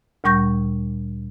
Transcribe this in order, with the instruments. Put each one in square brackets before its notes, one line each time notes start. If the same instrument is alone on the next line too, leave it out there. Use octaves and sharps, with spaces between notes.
[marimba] D2 A#2 G3 C#6 G6 A#6